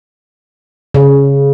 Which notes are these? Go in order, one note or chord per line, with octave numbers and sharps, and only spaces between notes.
C#3